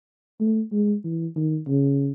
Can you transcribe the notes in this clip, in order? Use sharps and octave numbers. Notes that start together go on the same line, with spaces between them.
A3
G#3
E3
D#3
C#3